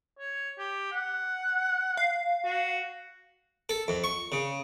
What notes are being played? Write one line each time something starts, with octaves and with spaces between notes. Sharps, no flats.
C#5
G4
F#5
F5
F#4
A4
F2
C#6
C#3